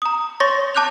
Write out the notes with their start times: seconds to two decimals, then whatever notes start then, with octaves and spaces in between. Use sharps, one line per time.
0.02 A#5 D#6
0.40 C#5 C6 C#6 A6 A#6
0.75 A5 D6 F#6 G6 F7